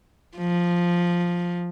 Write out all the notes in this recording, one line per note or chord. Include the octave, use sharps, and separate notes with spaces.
F3